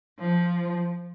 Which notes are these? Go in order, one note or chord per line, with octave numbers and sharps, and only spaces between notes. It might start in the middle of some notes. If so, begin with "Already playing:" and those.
F3